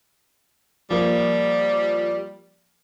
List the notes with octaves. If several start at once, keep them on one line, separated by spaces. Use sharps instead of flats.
F3 G3 A#3